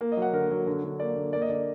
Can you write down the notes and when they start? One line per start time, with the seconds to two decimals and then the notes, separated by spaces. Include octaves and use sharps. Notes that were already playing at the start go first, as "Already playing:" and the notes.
0.01 A#3
0.12 D#5
0.17 F#3
0.22 F#5
0.33 D3 A#4
0.51 F#3
0.67 D3
0.84 D3
1.00 A#3 D5
1.16 D3
1.33 A#3 D5
1.42 D#5
1.49 D3 D5